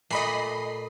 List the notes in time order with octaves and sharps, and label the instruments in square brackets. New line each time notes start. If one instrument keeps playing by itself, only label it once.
[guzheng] A#2 A3 [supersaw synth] D#5 B5 C7